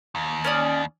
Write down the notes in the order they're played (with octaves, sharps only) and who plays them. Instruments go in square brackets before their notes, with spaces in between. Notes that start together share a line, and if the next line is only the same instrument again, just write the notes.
[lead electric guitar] D#2
[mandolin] C#4 D5 D#6